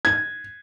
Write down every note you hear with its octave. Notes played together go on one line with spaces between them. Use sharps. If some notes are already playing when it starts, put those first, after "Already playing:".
G#6